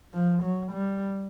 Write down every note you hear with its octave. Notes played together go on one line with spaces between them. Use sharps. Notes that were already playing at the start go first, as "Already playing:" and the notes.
F3
F#3
G3